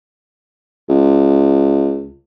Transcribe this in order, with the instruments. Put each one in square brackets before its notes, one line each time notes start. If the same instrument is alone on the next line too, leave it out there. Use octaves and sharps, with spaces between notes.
[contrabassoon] C#2